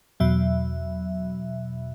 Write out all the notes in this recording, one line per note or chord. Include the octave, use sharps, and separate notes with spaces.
E2 B2 F#3 E5